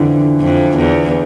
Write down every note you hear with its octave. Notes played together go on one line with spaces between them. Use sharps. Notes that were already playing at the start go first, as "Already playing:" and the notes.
Already playing: F2 D3 E3
F2
E2